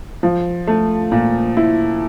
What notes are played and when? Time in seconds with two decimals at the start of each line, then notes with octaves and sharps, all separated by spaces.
0.23 F3
0.67 A3
1.12 A#2
1.57 E4